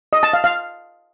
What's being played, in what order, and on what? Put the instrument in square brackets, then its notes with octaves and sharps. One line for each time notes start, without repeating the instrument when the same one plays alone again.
[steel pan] D#5
A5
F5
F5